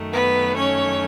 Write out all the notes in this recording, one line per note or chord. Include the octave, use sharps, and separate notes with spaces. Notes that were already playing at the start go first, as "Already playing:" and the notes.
Already playing: F#2 D#3 F#3 A3
B3 B4
C#4 C#5